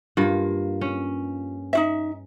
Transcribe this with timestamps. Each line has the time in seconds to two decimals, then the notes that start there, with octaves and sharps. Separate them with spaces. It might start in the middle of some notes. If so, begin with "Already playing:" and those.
0.17 G2 A#3 F4
0.81 C#4
1.73 D#4 F4 E5